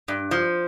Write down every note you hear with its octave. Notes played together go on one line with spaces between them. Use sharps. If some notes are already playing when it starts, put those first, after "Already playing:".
G2
F3